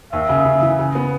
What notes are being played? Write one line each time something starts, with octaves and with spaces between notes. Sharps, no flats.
D#2 E5
C#3
C#3
E3
C#3
B3